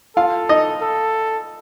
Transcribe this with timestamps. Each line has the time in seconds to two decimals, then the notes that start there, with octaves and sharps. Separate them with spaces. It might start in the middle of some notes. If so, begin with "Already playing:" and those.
0.16 F4 A4 F5
0.49 D#4 D#5
0.81 A4